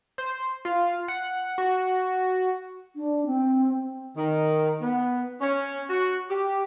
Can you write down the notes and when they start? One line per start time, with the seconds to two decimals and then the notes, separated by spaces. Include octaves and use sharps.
0.18 C5
0.65 F4
1.08 F#5
1.58 F#4
2.95 D4
3.26 C4
4.15 D#3
4.81 B3
5.40 C#4
5.89 F#4
6.29 G4